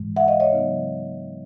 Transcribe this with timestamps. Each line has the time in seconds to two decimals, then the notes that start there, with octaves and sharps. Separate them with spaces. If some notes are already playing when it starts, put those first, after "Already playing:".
Already playing: G#2 E3 G#3
0.16 E5 F#5
0.28 D#5 F5
0.40 C#5 D#5
0.52 C#3 F#3 B3 D#4